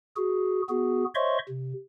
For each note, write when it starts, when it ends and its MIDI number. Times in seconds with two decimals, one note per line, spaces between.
0.16 0.62 66
0.16 0.62 68
0.69 1.05 59
0.69 1.05 66
0.69 1.05 68
1.15 1.38 72
1.15 1.38 73
1.15 1.38 75
1.15 1.38 76
1.15 1.38 84
1.15 1.38 85
1.48 1.73 48